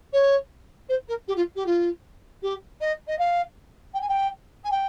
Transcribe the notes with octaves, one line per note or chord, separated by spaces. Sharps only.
C#5
C5
A#4
G4
F4
G4
F4
G4
D#5
D#5
F5
G5
G#5
G5
G#5
G5